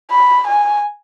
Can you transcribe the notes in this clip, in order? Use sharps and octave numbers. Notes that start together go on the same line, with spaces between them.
B5
G#5